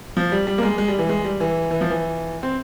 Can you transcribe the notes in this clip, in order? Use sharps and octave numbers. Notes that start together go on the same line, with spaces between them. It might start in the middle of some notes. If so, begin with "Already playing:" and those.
F3
G3
G3
A#3
G#3
G#3
G3
E3
G#3
G3
E3
E3
F3
E3
C4